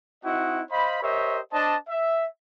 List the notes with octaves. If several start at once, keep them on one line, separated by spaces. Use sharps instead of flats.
C4 D#4 E4 F#4 D#5 F#5
C5 D#5 F5 B5
G4 A#4 C5 C#5 D#5 E5
D4 C5 D5 D#5 A5
E5